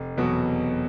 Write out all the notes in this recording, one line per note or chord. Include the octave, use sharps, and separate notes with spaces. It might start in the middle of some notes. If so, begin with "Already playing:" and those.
Already playing: F1
E2 B2 F#3 B3